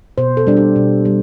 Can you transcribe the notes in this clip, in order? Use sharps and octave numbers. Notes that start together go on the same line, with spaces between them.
B2 C5
A4
G3 D4
G4
B2
G3